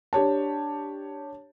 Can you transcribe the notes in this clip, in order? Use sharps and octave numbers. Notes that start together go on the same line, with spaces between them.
D4 G4 C#5 A5